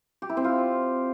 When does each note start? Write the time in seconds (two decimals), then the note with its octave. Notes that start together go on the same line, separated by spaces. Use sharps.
0.22 G4
0.29 E4
0.37 C4
0.44 F4